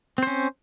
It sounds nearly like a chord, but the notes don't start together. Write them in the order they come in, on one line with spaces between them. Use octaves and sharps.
C4 C5 C#4